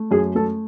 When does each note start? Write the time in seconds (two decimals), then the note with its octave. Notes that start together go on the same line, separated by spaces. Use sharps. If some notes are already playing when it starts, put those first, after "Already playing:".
Already playing: A3
0.11 F#2 G#4
0.35 A3 A4